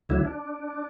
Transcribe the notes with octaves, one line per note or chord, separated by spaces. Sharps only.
D2 D3 F#3 E4
D4